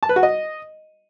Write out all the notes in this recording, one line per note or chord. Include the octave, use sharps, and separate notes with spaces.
A5
B4
F#4
D#5